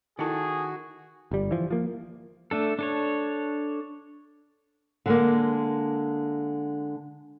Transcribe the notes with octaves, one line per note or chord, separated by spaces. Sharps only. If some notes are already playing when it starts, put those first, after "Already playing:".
D#3 E4 F#4 G#4 A4 A5
G1 G3
E3 F3
F3 A#3
A3 D4 A4
D4 A4 C#5
D3 G#3 A#3